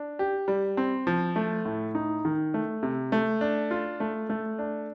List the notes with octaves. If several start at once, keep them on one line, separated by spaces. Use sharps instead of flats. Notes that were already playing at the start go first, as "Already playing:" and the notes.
Already playing: D4
G4
G3
C4
F3
A3
A2
D#4
D#3
A3
C3
A3
D4
F4
A3
A3
D4